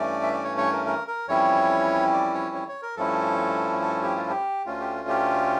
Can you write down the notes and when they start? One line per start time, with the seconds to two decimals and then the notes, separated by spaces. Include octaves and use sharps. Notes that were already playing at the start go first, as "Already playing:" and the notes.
Already playing: G2 E3 A3 C#4 D5
0.23 E5
0.33 D5
0.44 C#5
0.58 C#5
0.72 A#4
0.87 A#4
1.07 A#4
1.28 F2 E3 G3 C#4 E4 C#5
2.13 D5
2.34 C#5
2.55 C#5
2.68 C#5
2.82 A#4
2.97 G2 F3 A3 C#4 E4 A4
3.82 A4
4.03 G4
4.16 F4
4.30 G4
4.66 D2 D3 A3 C#4 F4
4.80 G4
5.08 G4